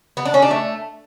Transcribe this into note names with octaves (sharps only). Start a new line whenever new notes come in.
B3
D4
C#4
D4
A3